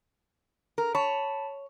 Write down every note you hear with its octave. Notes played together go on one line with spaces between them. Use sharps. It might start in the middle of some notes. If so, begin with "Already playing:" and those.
A#4
C#5 A5 B5